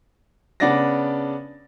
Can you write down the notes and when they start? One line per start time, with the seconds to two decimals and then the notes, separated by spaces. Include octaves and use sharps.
0.60 C#3 B3 D4 D5 A6 A#6